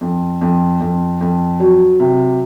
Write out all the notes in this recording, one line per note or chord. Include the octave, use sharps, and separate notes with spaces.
F2
F2
F2
F2
F#3
C3